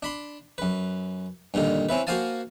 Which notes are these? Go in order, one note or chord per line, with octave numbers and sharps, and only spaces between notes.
D4 B5 C6
F#2 B4
G2 A#2 D3 D#3
C4 C#4 E4 B4
A#3 F#4 C5 F5 G#5 A5